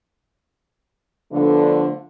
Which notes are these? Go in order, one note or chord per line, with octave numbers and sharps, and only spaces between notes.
D3 F3 A3 B3 D4